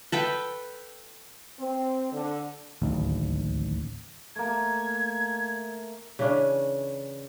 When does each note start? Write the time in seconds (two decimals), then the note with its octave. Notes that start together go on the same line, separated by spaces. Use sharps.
0.12 A4 B4 G5
1.59 C4
2.12 D3
2.82 D1 A1 D#2
4.36 A3 A#3 G#6
6.19 C#3 E3 C#4 D4